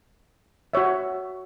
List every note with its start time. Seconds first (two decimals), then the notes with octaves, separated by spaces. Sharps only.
0.73 F#4 C#5 E5